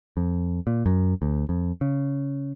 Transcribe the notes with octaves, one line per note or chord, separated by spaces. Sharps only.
F2
A#2
F#2
D2
F2
C#3